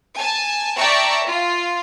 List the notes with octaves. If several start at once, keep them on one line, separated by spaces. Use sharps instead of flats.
G#5 A5
D5 E5 G5 A5 A#5 C#6
F4